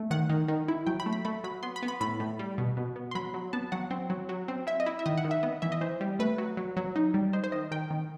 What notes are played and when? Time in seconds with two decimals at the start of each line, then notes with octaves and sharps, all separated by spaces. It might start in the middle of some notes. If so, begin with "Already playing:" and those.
Already playing: A3
0.11 D#3 F#5
0.29 D#3
0.48 D#3
0.68 E4
0.87 F#3 G5
1.00 B5
1.06 A3
1.13 B5
1.25 A3 B5
1.44 F#3 B5
1.63 B3 C6
1.76 B5
1.83 B3
1.88 B5
2.01 A2 B5
2.20 A2
2.39 G3
2.58 B2
2.77 B2
2.96 B3
3.11 C6
3.15 F#3 B5
3.34 F#3
3.53 B3 A5
3.72 F#3 F#5
3.91 C4
4.10 F#3
4.29 F#3
4.48 C4
4.67 E4 E5
4.80 D#5
4.86 E4
4.99 E5
5.06 D#3 D#5
5.18 F#5
5.24 D#3
5.31 E5
5.43 B3 D#5
5.62 E3 E5
5.72 D#5
5.81 E3 C5
6.01 G3
6.19 A3 B4
6.38 F#3
6.57 F#3
6.77 F#3
6.96 D#4
7.14 G3
7.33 D#4 C5
7.44 C5
7.52 D#3 D#5
7.72 D#3 G5
7.91 D#3